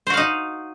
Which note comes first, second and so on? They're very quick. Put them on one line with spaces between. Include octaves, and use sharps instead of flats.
C5 F#4 F5 D#4